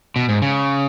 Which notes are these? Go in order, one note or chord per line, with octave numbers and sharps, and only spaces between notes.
B2
G#2
C#3